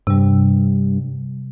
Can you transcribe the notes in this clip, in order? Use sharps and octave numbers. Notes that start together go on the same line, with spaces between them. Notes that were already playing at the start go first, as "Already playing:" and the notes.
G2 C3 G3